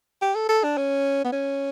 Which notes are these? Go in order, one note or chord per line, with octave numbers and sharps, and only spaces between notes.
G4
A4
A4
D4
C#4
B3
C#4